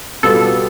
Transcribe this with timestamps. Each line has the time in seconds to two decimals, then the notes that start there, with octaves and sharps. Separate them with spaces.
0.23 B2 G3 B3 F4 A4